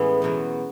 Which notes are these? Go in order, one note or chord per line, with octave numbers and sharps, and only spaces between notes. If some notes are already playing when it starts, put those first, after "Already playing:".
Already playing: A2 E3 G#3 B3 C#4
E2 B2 F#3